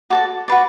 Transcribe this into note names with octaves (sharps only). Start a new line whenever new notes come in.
F#4 A4 D5 D6
F#4 B4 D5